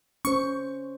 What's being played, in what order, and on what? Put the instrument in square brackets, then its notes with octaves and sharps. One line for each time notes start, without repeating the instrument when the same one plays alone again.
[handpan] C#4 C5 [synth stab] C#6